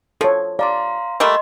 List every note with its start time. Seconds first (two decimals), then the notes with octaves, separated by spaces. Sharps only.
0.21 F3 A4 C#5
0.59 D5 F5 A#5 C6
1.20 G3 A3 A#3 D#5 C6